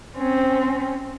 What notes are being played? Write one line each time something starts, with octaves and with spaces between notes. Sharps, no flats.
C4 C#4